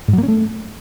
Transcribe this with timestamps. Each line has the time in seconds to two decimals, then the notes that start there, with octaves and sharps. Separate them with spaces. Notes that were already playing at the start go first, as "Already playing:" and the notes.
0.08 G#2
0.13 F#3
0.18 A#3
0.23 C#4
0.28 A3